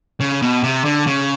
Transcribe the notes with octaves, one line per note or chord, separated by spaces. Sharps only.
C#3
B2
C3
D3
C#3